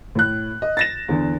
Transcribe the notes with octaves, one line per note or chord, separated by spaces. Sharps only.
A2 F#6
D#5
A6 A#6 E7
E2 D3